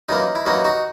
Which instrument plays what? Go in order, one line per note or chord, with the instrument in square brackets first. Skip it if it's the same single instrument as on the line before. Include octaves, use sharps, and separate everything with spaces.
[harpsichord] F#2 E3 A#3 D#4
E4
F#2 E3 A#3 D#4 F#4
D#4 F#4